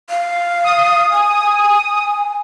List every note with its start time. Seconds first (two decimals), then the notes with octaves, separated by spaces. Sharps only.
0.10 F5
0.64 D#6
1.11 G#5